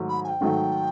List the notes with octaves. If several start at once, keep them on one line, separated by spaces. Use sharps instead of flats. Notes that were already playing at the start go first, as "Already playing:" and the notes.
Already playing: G#2 D#3 F#3 A3
B5
G#5
G5
G#2 D#3 F#3 A3